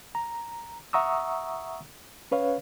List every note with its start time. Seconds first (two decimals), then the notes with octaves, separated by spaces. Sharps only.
0.15 A#5
0.93 E5 F#5 A#5 C#6 D#6 E6
2.31 C#4 B4 C#5 F5